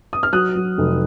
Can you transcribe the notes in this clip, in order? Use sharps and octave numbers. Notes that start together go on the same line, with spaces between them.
D#6
F6
F#3 D#6 F#6
F#3
F1